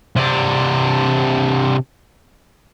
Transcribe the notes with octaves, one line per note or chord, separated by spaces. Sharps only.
C3 D4